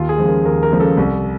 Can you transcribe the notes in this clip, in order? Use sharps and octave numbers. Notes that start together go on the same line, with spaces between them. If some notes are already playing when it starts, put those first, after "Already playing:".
Already playing: D#2 F4
G#4
C#3 F3 G#3
A#4
D#2 A#4
A#4
C#3 F3 G#3
A4
C2